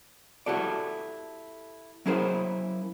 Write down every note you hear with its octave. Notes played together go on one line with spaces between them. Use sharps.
E4 F#4 G4 A4 D5
F#3 C#4 E4 G#4 A#4 C5